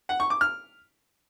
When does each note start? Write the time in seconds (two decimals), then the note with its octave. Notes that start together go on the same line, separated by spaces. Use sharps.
0.09 F#5
0.20 C#6
0.30 D6
0.41 F6